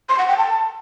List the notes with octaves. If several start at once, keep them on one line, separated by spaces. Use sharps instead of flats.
C6
F#5
G5
A5